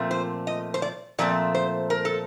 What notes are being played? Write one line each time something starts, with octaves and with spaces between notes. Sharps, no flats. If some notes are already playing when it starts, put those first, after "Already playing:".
Already playing: A#2 F3 A3 C4
C5
D#5
C5
D5
A#2 F3 A3 C4 D5
C5
A#4
A4